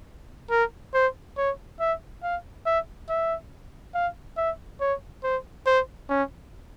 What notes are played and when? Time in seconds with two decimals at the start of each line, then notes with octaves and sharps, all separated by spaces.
0.51 A#4
0.94 C5
1.37 C#5
1.80 E5
2.23 F5
2.66 E5
3.09 E5
3.95 F5
4.37 E5
4.81 C#5
5.24 C5
5.67 C5
6.10 C#4